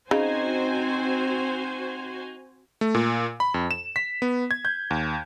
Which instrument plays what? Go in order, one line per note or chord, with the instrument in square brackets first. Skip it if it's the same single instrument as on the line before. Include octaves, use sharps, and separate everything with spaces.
[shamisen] C#3 [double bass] C4 [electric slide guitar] D#4 [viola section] F#4 C5 G#5
[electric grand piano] A3
A#2
B5
F2
E7
B6
B3
G#6
G6
D#2